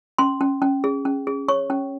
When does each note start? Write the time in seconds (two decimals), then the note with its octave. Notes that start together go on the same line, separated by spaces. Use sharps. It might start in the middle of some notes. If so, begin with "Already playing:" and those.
0.18 C#4 C6
0.41 C#4
0.62 C#4
0.84 G#4
1.05 C#4
1.27 G#4
1.48 C#5 C#6
1.70 C#4